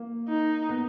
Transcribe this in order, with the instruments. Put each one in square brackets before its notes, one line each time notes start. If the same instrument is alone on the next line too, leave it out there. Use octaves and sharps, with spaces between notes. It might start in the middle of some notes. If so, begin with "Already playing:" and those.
Already playing: [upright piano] A#3
[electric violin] D#4
[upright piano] B3